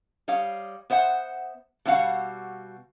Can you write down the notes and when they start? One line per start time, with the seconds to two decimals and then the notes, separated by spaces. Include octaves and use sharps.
0.28 G3 C#5 D#5 F5
0.90 B3 C5 E5 F#5
1.85 B2 G3 E4 F#4 F5 F#5